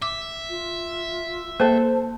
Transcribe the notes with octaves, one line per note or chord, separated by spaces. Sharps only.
E5 D6
F4
A#3 A4 C5 A5